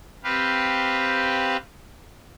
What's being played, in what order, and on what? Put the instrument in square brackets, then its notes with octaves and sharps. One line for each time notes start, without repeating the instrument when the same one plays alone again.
[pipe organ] C4 G4 B4 F5